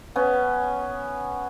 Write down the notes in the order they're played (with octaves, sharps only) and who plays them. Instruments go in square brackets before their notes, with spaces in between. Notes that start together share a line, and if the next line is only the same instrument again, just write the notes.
[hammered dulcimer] B3 C#4